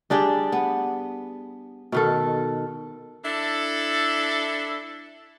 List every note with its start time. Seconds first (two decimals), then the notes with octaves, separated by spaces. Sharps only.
0.10 G3 D4 G4 G#4
0.52 B3
1.92 B2 D#3 A4
3.25 D4 E4 A4